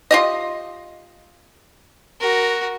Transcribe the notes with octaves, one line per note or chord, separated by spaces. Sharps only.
F4 G4 D#5
F#4 A#4